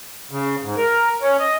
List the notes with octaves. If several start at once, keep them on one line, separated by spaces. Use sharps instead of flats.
C#3
G#2
A#4
C#4
D#5